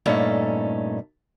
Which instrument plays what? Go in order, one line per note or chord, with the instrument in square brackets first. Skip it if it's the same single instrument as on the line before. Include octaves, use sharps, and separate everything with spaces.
[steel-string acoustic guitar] G2 A#2 A3 C#4 D#4